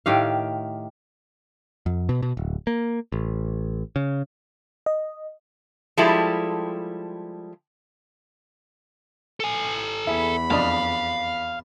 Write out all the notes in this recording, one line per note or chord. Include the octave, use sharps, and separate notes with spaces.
A2 D#3 G4 F5
F2
B2
B2
D1
A#3
A1
C#3
D#5
F3 G3 G#3 E4 G4 A4
A4 G#5
E2 E4 G#4 B5
F2 D4 D#5 F5